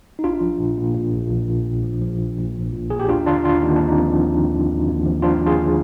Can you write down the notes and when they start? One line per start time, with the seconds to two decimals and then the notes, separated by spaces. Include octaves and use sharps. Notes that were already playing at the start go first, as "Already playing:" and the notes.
0.19 D#4
0.24 A#1 D4 F4
0.41 F3
0.59 A#2
0.77 A#2
0.95 A#2
1.13 A#1
1.30 A#1
1.48 A#2
1.66 A#1
1.83 F3
2.01 F3
2.19 A#2
2.38 A#2
2.55 A#1
2.73 A#2
2.90 A#2 G#4
2.99 G4
3.09 D#2 D4 F4
3.26 D3 D4 F4
3.44 D#2 D4 F4
3.62 D#2 D#4
3.76 D3 D4
3.88 C4 D#4
3.98 F3
4.16 F3
4.34 D#2
4.51 D#2
4.69 D#2
4.88 D#2
5.05 F3
5.22 F3 D4 F4
5.41 D#2
5.46 F4 G#4
5.58 D3